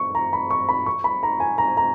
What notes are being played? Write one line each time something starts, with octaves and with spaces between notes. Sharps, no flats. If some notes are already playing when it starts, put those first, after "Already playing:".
Already playing: C#6
A#5
B5
C#6
B5
C#6
B5
A#5
G#5
A#5
A#5